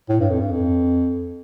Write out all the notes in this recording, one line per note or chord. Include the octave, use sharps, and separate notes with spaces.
A2
G2
F2
G2
F2